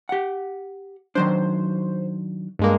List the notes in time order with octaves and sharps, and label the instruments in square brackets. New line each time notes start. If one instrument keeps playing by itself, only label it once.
[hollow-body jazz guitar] G4 F#5
[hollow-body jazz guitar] D#3 F#3 D4 [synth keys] C5
[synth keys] G2 G#3 A#3